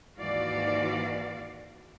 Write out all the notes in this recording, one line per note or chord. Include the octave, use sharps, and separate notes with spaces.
D#2 G#2 E3 F#4 D5 F5